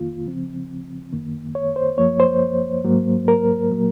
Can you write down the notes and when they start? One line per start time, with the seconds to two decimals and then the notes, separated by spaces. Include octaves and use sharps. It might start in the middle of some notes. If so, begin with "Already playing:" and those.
Already playing: F2 D#3 A#3 F4
0.25 C#3 F3 C4
1.13 F#2 D#3 A#3
1.55 C#5
1.76 C5
1.98 F#2 F3 A#3 C#5
2.20 C5
2.84 G#2 F#3 A#3
3.28 A#4
3.71 A#2 F#3 A#3